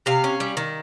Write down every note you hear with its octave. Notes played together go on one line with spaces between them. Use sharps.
C3 F5
C#4
G3
D#3